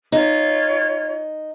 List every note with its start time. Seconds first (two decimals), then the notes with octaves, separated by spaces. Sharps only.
0.12 D#4 F4 C#5